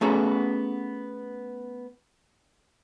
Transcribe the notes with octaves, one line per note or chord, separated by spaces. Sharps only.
A3 B3 C#4 F#4 G#4 A4